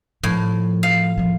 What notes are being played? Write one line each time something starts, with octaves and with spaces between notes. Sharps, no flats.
A2 F3
F5
C3 F3